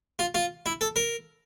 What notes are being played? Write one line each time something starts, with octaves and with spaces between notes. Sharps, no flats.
F4
F4
E4
A4
A#4